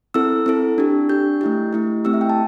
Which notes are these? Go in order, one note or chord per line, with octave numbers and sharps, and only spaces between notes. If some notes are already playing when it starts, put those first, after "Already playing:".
C4 E4 A4 E6
C4 E4 A4
D4 G4
D4 G4 G6
A3 E4 G4
A3 E4 G4
A3 C4 E4 G4 E6
E5
G5
A5